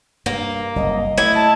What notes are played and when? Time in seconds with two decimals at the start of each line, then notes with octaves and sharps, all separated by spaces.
0.26 G2 A#3
0.76 F#1 C2 D#5
1.18 A3 E4 G#6
1.35 A5